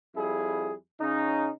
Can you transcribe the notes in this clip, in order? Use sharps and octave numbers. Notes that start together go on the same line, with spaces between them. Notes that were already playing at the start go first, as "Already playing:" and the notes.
F2 G3 E4 G#4
C#3 C#4 D#4